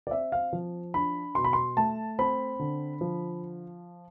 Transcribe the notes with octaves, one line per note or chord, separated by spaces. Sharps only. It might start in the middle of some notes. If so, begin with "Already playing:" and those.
D5
C4 E5
F5
F3
D4 B5
B2 C6
B5
C6
A3 A5
C4 B5
D3
F3